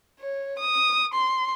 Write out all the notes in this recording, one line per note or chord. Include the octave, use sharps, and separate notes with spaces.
C#5
D#6
C6